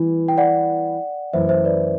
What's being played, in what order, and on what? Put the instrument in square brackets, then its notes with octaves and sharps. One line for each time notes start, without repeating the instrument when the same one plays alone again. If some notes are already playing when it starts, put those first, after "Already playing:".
Already playing: [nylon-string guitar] E3 G3 B3
[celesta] G5
D5 F#5
[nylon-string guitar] F#2 E3 A3 E4 [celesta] C5 E5
[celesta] C5 E5
B4 D5